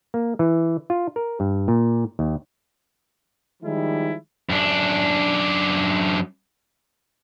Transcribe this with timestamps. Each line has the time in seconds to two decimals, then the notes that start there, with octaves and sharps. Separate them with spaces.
0.14 A#3
0.39 E3
0.90 F4
1.16 A#4
1.40 G2
1.68 A#2
2.19 D#2
3.63 D#3 F3 G3 G#3 D#4 E4
4.49 F#2 D4